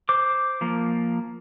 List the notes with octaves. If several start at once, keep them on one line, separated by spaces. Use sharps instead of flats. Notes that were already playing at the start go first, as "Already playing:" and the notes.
C5 D6
F3 A#3